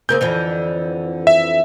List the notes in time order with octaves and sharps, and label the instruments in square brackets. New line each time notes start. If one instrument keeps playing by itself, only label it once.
[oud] C#3 A#3 C4 [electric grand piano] G6
[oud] F2 D3 E3
[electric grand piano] E5